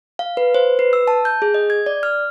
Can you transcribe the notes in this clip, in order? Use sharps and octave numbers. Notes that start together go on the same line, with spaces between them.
F5
B4
C5
B4
E6
A5
G6
G#4
D#5
G#6
D5
F6